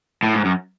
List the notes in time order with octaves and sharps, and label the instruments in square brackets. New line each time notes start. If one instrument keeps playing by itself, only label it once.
[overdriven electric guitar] A2
G#2
F#2